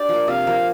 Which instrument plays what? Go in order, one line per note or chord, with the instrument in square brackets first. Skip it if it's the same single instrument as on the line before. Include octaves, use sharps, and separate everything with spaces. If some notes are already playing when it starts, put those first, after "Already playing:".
Already playing: [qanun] D4 G4 [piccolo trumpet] D5
[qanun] F3 A#3
[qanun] C3 [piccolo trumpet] F5
[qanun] F3 A#3